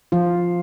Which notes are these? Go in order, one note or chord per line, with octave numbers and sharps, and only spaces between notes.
F3 F4